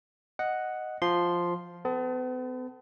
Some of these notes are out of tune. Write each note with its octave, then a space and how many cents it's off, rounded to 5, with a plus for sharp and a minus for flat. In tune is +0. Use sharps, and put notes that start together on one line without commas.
D#5 +0 F#5 +0
F3 +0 C6 +0
B3 +45 A4 +0 A5 +0